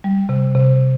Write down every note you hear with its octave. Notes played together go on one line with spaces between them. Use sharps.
G3
C3
C3